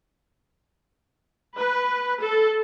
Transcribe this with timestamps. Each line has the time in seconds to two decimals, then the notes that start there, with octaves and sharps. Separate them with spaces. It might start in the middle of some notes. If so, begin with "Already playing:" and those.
1.58 B4
2.23 A4